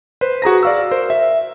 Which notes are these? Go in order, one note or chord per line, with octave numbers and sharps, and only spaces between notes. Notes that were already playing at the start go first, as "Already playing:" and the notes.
B4 C5
F#4 G#4 A#5 A#6
D5 F5 E6
A#4 C5
E5